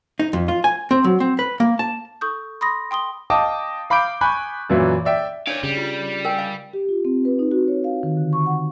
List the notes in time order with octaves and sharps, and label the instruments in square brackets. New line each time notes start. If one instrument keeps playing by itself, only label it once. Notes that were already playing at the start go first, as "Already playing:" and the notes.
[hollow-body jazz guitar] D#4
F2
F4
G#5
C4
F#3
C4
B4
A#3
A5
[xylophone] A4 C#6 D#6 G6
B5 C6 D#6 A#6
G5 C6 D#6 G7
[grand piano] D#5 F5 G5 A5 D6 D#6
F5 B5 D6 G6 D7
G#5 B5 C#6 F#6 G6
F#2 A#2 E3 F#3 E4
D5 E5 G5
[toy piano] D4 C#5 [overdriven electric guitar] D5 F5
[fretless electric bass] C#3 [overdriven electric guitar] G3
[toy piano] F4
A#4 G5 G#5
F5 G#5
[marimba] G4
F4
C4
B4
D#4
F#4
C#5
F5
D#3
D3
C#6
F#5